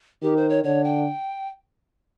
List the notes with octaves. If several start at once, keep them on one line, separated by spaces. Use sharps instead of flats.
D#3 G4
C5
C#5
D3 C#5
G5